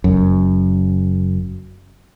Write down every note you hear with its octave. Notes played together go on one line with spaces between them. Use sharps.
F#1 F#2